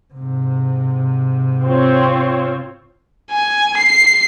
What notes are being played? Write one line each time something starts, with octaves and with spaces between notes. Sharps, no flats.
G#2 C3
C4 F4 C#5
G#5
C7